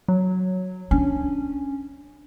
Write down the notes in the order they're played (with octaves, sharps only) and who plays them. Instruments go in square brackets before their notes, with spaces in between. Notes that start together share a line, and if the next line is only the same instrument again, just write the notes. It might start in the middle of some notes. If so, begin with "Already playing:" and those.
[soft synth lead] F#3
[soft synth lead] C#4 [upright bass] D4